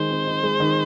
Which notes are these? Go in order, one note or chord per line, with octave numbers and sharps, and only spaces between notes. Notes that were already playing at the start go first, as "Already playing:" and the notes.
Already playing: D#3 G#3 C5
C4
D#4
G#3
D#3